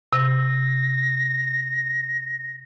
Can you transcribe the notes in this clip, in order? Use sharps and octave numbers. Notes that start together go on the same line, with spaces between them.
C3 A#6